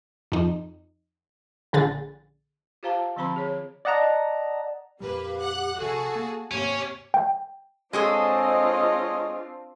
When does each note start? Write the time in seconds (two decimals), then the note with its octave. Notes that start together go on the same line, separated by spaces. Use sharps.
0.32 F2 D#4
1.73 A#1 D3 G#4 A6
2.83 F4 G4 C5 F5 A5 A#5
3.16 D3 F3 C4 A5 B5 C6
3.36 G#4 C#5
3.85 D5 D#5 F#5 A5 A#5
5.00 F2 A#2 G3 A#3 G4 B4
5.39 F#5 F#6
5.78 A#1 C3 F#4 G#4 A4 A5
6.15 A#3
6.51 D#2 G#2 C3 A#3 C#4 G4 C#5
7.14 G5
7.93 G#3 C4 D4 F4 G#4 A4 C#5 D#5